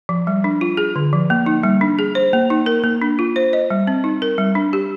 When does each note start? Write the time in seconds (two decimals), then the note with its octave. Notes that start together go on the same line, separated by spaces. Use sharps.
0.09 F3
0.27 G3
0.44 D4
0.61 F4
0.77 G#4
0.96 D3
1.13 F3
1.30 A#3
1.46 D#4
1.63 G3
1.81 D4
1.99 G#4
2.15 C5
2.33 A#3
2.50 D#4
2.66 A#4
2.84 A#3
3.02 D4
3.19 F4
3.36 C5
3.53 D#5
3.70 G3
3.87 C4
4.04 D#4
4.22 A#4
4.38 G3
4.55 D4
4.73 G4